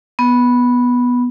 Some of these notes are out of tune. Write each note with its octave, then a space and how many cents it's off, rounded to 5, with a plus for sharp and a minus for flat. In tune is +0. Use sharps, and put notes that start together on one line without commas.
B3 -5